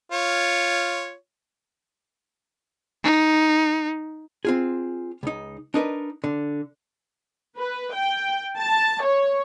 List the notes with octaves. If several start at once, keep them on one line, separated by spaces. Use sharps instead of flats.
F4 C#5
D#4
C4 F4 G#4
C#2 D#4
D4 D#4 A#4 B4
D3
B4
G5
A5
C#5